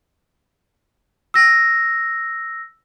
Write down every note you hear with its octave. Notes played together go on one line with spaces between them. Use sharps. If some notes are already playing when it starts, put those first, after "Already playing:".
E6 A#6